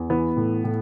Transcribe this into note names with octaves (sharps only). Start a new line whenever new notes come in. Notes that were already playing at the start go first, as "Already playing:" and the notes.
Already playing: E2
E3 B3
A2
A2